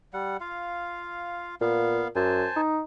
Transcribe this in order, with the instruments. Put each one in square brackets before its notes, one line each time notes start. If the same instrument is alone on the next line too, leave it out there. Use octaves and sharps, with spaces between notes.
[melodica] G3 F#5
F4 F5
[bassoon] A#2 [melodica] B3 F5
[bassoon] F#2 [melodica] C5 G#5 A5
[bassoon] D#4